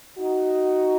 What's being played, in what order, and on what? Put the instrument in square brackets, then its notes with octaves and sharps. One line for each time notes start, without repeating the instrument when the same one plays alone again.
[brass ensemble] D#4 F#4